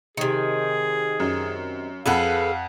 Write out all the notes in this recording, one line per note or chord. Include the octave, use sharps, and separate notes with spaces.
C3 D#3 G#4
F#2
F2 G#4 A4 B4 F5 F#5